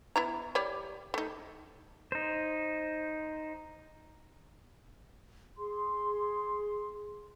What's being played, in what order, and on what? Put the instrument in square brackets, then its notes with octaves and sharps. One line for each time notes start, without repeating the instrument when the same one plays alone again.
[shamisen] B3 E4 A#5
G3 C#5 D5
A3 D#4
[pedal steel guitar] D#4 C5
[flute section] G#4 C6